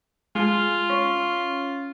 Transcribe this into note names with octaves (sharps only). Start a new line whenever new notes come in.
G#3 F4
C#4